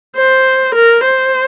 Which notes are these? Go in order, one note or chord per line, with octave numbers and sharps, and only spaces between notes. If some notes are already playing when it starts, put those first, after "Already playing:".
C5
A#4
C5